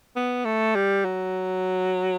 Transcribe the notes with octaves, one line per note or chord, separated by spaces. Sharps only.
B3
A3
G3
F#3